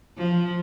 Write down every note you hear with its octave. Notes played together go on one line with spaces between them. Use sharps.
F3